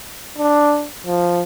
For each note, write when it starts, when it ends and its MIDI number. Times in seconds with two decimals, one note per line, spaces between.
0.38 0.85 62
1.06 1.43 53